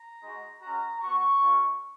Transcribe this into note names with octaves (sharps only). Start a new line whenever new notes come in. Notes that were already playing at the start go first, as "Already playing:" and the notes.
Already playing: A#5
G#3 D#4 F#4
G#3 C#4 F#4 A#5
B3 F#4 C#6
G#3 C#4 F4